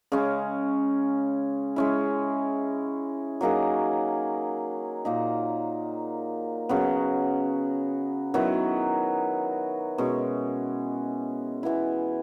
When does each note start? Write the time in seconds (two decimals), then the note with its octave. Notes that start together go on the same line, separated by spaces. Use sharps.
0.12 C#3 G#3 C#4
1.76 G#3 C#4 E4
3.41 F#3 A#3 D#4 G#4
5.05 A#2 A#3 D#4
6.69 C#3 F#3 B3
8.34 D#3 F#3 B3 E4
9.98 B2 G#3 C#4
11.63 E3 B3 E4